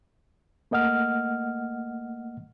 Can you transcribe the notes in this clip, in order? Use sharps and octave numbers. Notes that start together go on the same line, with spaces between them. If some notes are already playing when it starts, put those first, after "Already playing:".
A3 A#3 D#5 F#5 F6